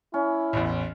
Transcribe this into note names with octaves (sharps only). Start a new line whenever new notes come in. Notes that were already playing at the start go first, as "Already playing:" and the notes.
C#4 E4
A1 E2